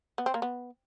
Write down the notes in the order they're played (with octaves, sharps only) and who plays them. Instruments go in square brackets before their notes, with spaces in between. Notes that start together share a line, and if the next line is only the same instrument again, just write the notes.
[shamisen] B3
C4
A#3
B3